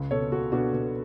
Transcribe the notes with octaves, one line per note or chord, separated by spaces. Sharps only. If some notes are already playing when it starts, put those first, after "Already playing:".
Already playing: C#2
B2 A4 C#5
B2 F#4 A4
B2 D4 F#4
B2